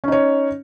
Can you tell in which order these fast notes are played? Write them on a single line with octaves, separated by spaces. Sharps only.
C#4 D#4 C#5